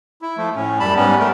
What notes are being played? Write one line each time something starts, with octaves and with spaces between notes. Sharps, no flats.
E4
F3 A3
A2 C#4
F#2 G3 A5 B5
G#2 G3 B3 C#4
G3 A3 A#4